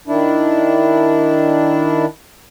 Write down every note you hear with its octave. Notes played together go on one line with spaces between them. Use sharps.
D#3 D4 E4